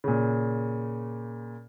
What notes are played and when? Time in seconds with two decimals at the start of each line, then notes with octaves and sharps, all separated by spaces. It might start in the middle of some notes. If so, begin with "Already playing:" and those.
0.04 A#2 C#3